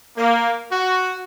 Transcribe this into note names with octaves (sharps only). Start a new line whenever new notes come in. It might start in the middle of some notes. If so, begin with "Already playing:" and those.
A#3
F#4